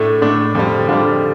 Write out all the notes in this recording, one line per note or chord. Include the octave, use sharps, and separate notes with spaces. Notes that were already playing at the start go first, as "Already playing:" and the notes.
Already playing: A2 A3 D4
A2 A3 D4
F2 D3 G3
F2 D3 G3 D4 F4